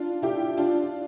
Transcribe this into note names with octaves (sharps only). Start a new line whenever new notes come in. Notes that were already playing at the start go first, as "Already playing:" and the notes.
Already playing: D4 F4
E4 G4
D4 F4